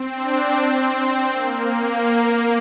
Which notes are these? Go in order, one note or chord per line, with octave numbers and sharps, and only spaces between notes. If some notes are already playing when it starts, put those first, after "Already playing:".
Already playing: C4
D4
C4
A#3